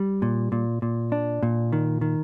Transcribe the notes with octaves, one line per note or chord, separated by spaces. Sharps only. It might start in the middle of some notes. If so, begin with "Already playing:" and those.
Already playing: G3
A#2
A#2
A#2
D4
A#2
D#3
D#3